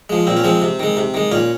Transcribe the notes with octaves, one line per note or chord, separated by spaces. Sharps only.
F3 G#3
A#2 C4
C#4
F3 G#3 C4
C3
D#3 G#3
C3
D#3 G#3
A#2 C#4